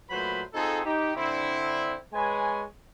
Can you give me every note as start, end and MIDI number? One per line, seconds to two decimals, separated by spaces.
0.10 0.42 46
0.10 0.42 54
0.10 0.42 57
0.10 0.42 71
0.10 0.42 72
0.10 0.42 83
0.54 0.81 60
0.54 0.81 63
0.54 0.81 65
0.54 0.81 68
0.54 0.81 69
0.85 1.12 63
0.85 1.12 67
1.16 1.95 50
1.16 1.95 60
1.16 1.95 62
1.16 1.95 64
2.14 2.63 56
2.14 2.63 71
2.14 2.63 73
2.14 2.63 80